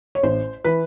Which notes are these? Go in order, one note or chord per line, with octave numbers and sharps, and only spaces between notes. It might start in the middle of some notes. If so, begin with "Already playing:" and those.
C#5
A1 C5
E3 B4